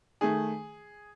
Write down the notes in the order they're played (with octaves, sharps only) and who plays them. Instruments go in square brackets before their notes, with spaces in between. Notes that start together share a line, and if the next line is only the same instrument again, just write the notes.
[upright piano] D#3 A3 G#4